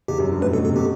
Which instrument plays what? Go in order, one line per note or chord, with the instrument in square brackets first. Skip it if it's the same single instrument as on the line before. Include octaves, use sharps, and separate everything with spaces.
[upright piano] E2 [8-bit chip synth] G4
[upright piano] F#2
G2
[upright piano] A2 [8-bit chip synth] B4
[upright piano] B2 [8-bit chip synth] A4
[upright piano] C3 [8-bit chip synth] A4
[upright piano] B2 [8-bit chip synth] G4